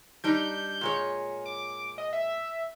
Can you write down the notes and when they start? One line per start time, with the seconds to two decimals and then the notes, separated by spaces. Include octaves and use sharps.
0.24 G3 D4 D#4 G6
0.81 A#2 G#3 C#5
1.46 D6
1.98 D#5
2.13 E5